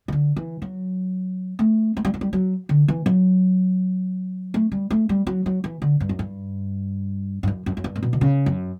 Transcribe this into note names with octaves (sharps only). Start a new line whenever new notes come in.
C#3
D3
E3
F#3
A3
A3
G3
F#3
G3
F#3
D3
E3
F#3
A3
G3
A3
G3
F#3
F#3
E3
D3
G2
F#2
G2
G2
F#2
F#2
F#2
G2
A2
B2
D3
C#3
F#2